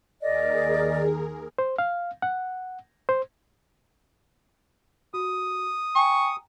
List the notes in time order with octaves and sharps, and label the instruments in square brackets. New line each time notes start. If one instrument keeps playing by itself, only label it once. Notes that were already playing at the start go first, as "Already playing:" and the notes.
[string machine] D#2 G#4 A#4 [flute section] D5 D#5
[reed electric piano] C5
F5
F#5
C5
[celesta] F#4 [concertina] D#6
[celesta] G5 G#5 A#5 [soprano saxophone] C#6